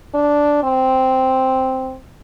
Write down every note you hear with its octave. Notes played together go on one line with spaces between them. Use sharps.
D4
C4